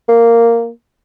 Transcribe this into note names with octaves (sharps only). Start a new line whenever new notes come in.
A#3